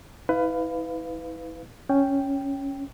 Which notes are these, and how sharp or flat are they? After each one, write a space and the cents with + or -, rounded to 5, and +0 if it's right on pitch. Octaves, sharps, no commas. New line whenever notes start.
E4 -35 B4 +20 F5 +0
C#4 +0 G5 +0